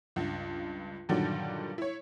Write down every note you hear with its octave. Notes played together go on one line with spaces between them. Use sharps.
C#2 G2
G2 A#2 D3 D#3 F#3 G3
E4 C#5